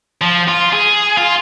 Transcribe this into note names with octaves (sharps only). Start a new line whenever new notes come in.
F3
F4
G#4
F4